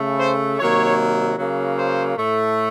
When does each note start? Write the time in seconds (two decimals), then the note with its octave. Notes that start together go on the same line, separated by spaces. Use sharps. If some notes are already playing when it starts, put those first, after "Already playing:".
Already playing: C#3 A3
0.19 C5
0.59 C3 D#3 F#3 A#3 C#5
1.38 C#3 F#3 A#3
1.77 C5
2.17 A2 A3